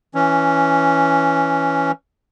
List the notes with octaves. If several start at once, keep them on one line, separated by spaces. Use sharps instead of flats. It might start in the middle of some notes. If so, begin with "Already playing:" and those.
E3 C#4